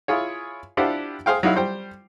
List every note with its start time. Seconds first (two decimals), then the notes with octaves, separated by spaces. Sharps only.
0.08 E4 F4 G#4 C#5
0.77 D4 E4 F4 G4 C5 F#5
1.26 G#4 C5 F5 G5
1.43 F#3 D#4 E4 F5
1.55 G3 C5 G5